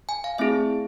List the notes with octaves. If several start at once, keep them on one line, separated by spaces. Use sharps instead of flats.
G#5
F5
A3 C4 E4 G#4 E5